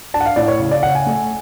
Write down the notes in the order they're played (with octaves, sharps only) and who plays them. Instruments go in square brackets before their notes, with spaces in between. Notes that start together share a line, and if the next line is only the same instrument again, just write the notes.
[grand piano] D4 A5
F#5
F5
A2 D5
C#5
C#3
D5
C#3 F#5
G#5
A3